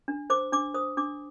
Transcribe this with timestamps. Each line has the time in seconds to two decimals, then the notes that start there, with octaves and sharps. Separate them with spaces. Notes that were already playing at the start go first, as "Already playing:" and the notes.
0.08 D4
0.30 C5 D6
0.52 D4 D6
0.74 C5 D#6
0.97 D4 D6